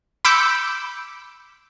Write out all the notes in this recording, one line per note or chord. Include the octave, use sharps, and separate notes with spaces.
B5 D6 E6 G6 C#7